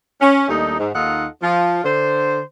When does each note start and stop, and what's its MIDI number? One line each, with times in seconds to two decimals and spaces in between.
0.21 0.46 61
0.48 0.76 39
0.48 0.76 55
0.48 0.76 57
0.48 0.76 62
0.48 0.76 63
0.78 0.89 44
0.94 1.26 39
0.94 1.26 63
0.94 1.26 65
0.94 1.26 69
0.94 1.26 75
0.94 1.26 78
1.42 1.79 53
1.42 1.79 65
1.84 2.40 50
1.84 2.40 72